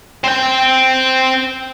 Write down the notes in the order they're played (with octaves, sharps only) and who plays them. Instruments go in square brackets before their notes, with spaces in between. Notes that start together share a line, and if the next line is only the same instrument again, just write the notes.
[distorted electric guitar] C4 G5